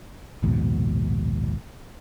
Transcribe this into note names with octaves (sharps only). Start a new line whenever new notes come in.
A#1 D#2 G#2 B2